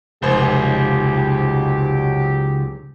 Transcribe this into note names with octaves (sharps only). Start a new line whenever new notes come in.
F1 C#2 G#2 F#3 G4 C5